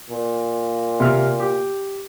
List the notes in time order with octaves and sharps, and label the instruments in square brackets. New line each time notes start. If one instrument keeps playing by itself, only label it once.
[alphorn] A#2
[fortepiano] C3 F6
G4